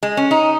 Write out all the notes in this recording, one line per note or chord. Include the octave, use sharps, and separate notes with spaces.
G#3
C#4
D#4